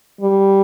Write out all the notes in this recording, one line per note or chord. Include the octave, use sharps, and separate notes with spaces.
G3